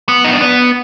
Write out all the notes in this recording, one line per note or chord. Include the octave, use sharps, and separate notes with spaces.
B3
D#4
D4
B3